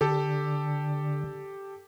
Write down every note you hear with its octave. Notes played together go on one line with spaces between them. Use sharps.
D3 G4 A4